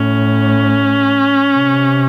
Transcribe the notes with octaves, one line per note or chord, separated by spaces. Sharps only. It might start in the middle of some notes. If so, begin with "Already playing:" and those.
Already playing: A2 C#4
C3